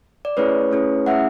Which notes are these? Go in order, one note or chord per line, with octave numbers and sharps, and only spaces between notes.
D5
A3 C#4 E4 G#4 B4 C#5
A3 C#4 E4 G#4
A3 C#4 E4 G#4 E5 F#5